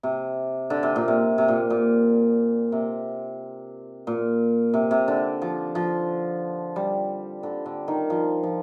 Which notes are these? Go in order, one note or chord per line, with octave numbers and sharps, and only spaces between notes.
C3
D3
C3
A#2
C3
C3
A#2
A#2
C3
A#2
C3
C3
D3
F3
F3
G3
D3
D3
D#3
F3
F3